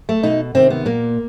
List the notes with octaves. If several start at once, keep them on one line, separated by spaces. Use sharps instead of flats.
A3
B2 D#4
C3 D#3 C4
B3
A#2 A#3